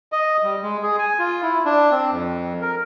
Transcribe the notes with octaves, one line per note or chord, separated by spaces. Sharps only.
D#5
G3
G#3
G#4
G#5
F4
E4
D4
C4
F2
A#4